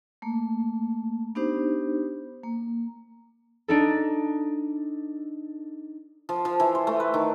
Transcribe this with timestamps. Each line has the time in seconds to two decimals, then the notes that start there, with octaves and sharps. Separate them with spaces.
0.22 A3 A#3
1.35 B3 D4 D#4 G4 C5
2.44 A#3
3.68 D4 D#4 A4
6.29 F3
6.45 F3
6.60 E3
6.75 C5
6.87 A3
7.00 B4
7.14 D#3